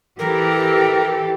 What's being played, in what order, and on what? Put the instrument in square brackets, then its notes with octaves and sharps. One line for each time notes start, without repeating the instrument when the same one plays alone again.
[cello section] E3 G4 A4 [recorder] A#4